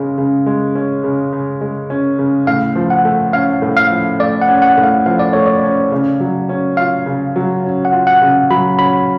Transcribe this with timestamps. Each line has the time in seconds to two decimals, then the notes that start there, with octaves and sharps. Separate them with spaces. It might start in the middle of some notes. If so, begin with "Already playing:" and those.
Already playing: C#3 G#3 C#4
0.18 C#3
0.46 G#3
0.75 C#4
1.04 C#3
1.33 C#3
1.61 G#3
1.90 C#4
2.19 C#3
2.47 A2 F5
2.75 F3
2.90 F#5
3.05 A3
3.33 C#4 F5
3.62 A2
3.77 F5
3.90 F3
4.19 A3 D5
4.41 F#5
4.48 C#4
4.62 F#5
4.77 A2
4.83 F5
5.06 F3 F5
5.19 D5
5.33 A3 C#5
5.46 D5
5.63 C#4
5.92 C#3
6.20 F#3
6.49 C#4
6.77 F4 F5
7.06 C#3
7.36 F#3
7.64 C#4
7.85 F#5
7.93 F4
8.07 F#5
8.21 C#3
8.50 F#3 B5
8.79 C#4 B5